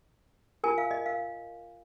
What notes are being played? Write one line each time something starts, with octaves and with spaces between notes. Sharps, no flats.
F4 A#4 G#5
F5
D#5
F5